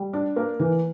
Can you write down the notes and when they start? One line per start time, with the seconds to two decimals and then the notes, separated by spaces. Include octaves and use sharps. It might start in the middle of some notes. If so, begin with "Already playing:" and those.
Already playing: G3
0.13 D4
0.36 A#3
0.59 E3